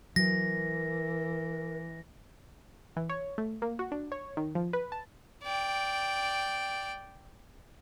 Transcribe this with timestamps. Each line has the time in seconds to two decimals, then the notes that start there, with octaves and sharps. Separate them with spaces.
0.16 E3 F#3 A#4 A#6
2.96 E3
3.09 C#5
3.38 A3
3.62 A#3
3.79 F#4
3.92 D4
4.12 C#5
4.37 D#3
4.55 F3
4.73 B4
4.92 A5
5.43 D5 G5